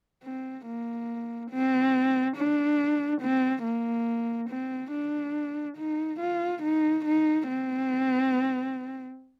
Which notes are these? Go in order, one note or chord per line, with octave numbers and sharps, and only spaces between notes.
C4
A#3
C4
D4
C4
A#3
C4
D4
D#4
F4
D#4
D#4
C4